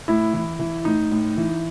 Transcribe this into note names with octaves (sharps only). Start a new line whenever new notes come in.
A2 E4
E3
E3
A2 D#4
A2
E3